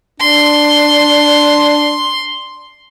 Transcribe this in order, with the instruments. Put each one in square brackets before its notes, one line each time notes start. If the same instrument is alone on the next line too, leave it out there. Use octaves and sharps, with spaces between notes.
[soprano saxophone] D4 [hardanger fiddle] C6